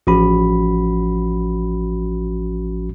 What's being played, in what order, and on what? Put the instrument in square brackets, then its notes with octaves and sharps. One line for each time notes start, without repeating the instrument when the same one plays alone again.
[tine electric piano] A1 F3 C#4 F#4 B5